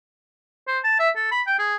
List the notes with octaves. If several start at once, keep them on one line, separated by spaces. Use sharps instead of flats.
C5
A5
E5
A4
B5
G5
G#4